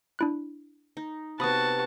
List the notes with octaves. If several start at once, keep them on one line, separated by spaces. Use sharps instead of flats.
D4 E4 F#6
D#4
C3 B3 F#4 A5 B5 D#6